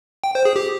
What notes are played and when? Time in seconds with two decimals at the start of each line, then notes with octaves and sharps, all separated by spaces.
0.24 G5
0.35 C5
0.45 G#4
0.56 G4